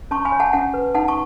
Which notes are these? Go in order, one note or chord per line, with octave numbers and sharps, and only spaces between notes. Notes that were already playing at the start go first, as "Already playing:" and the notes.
C#4 A5 C#6
G#5 B5
C#5
F#5 A5
C#4 F#5 A5
B4
D#4 F#5 A5
A5 C#6